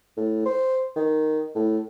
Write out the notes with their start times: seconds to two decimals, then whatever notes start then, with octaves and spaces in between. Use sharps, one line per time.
0.17 A2
0.46 C5
0.96 D#3
1.55 A2